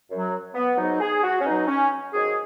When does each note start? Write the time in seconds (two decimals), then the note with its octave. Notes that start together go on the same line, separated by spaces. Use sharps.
0.11 F#2 F#3
0.55 B3
0.77 G#2 F#3 D#4
1.00 G#4
1.23 F#4
1.41 C#4
1.45 B2 F#3 D#4
1.68 C#4
2.13 G#2 D#3 F#3 G#4